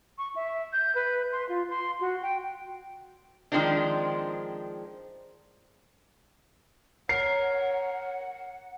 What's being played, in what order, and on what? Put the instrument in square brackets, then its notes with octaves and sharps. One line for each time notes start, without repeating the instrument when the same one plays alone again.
[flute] C#6
E5
G6
B4
C6
F4
C6
F#4
G5
[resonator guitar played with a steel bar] D#3 F3 G#3 C4 D4
[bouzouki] A#4 [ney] C#5 [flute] F#5 [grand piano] C7